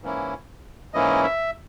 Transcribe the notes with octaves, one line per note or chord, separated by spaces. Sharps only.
G#2 E3 A#3 C#4 E4
G#2 E3 A#3 C#4 E4 D#5
E5